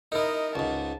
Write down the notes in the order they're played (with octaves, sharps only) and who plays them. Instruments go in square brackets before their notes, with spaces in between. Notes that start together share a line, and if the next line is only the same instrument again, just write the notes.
[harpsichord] D#4 E4 [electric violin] A#4 D#5
[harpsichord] C#2 G#2 [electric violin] A5